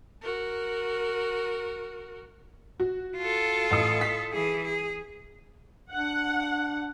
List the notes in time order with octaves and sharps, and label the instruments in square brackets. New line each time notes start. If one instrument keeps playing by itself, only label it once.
[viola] F#4 A#4
[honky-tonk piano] F#4
[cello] F4 A4
[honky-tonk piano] A1 D#6
B6
[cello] E3 G#4
G#4
[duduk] D4 [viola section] F#5